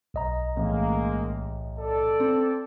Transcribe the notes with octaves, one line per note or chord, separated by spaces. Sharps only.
B1 D#5 A#5
A1 G#3 A#3
A4 D5
C4